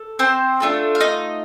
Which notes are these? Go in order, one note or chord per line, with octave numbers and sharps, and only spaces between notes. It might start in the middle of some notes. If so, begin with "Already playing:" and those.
Already playing: A4
C4 C5
A3 D4 F4 A4
F5
D#4 D#5